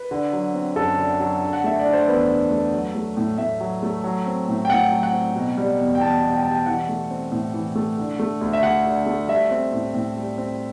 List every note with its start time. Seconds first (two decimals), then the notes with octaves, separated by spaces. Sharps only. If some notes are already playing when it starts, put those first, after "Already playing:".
Already playing: B4
0.11 D3
0.33 F#3
0.54 C4
0.76 F#2 A4
0.98 D3
1.20 F#3
1.42 D3
1.53 F#5
1.64 A3 E5
1.79 D5
1.86 D4
1.93 C5
2.08 E2 B4
2.29 D3
2.50 A3
2.73 F#3
2.95 A3
3.17 A2
3.38 A2 E5
3.60 F#3
3.83 A3
4.04 F#3
4.26 C4
4.48 A2
4.65 G5
4.70 A2 F#5
4.92 F#3
5.03 F#5
5.13 C4
5.36 B2
5.57 G3
5.78 E2
5.95 G5
6.01 E2 A5
6.22 B2
6.33 G5
6.43 G3 A5
6.52 G5
6.66 E3 F#5
6.89 A3
7.10 C4
7.32 A2
7.54 E3
7.75 A3
7.98 D3
8.19 A3
8.41 D2
8.53 E5
8.63 D2 F#5
8.86 D3
9.06 A3
9.28 G3 E5
9.51 C4
9.73 A2
9.94 A2
10.16 G3
10.38 C4